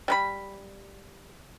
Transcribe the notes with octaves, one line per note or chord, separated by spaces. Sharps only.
G3 A#4 B5